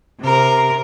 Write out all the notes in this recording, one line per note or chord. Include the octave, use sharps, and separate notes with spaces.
C3 A#4